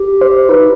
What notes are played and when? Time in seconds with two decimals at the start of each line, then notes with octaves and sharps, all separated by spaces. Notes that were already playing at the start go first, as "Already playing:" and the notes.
Already playing: G4
0.21 C5
0.49 D#4 B4